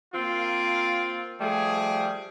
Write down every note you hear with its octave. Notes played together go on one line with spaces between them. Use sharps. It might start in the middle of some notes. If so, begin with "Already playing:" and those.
A#3 C4 F4
F3 G3 A3 G#4